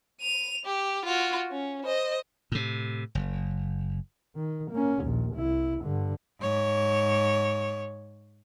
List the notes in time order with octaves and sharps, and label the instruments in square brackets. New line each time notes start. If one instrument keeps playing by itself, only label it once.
[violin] D#7 F7
G4
F4 F#4
C#4
C5 D#5
[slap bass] A2 C3
F#1
[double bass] D#3
A#3 C#4
A#1 D#2
C2 E4
G2 D3
[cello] G#2 C#5